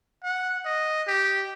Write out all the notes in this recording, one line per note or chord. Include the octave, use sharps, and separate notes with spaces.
F#5
D#5
G4